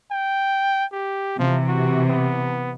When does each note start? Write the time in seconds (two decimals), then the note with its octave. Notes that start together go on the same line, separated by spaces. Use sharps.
0.11 G5
0.93 G4
1.39 C3 E3 F3
1.68 F#4
2.09 B3